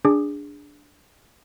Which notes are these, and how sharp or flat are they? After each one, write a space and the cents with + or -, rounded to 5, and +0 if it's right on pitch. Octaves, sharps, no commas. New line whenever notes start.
D4 -5 G#4 -15 D6 +15